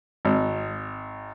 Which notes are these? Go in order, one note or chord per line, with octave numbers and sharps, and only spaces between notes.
G#1